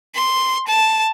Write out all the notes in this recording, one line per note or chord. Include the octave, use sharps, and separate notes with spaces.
C6
A5